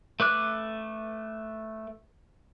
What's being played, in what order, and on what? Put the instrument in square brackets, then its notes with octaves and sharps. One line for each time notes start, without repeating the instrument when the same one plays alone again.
[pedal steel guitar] A3 B4 D6 F#6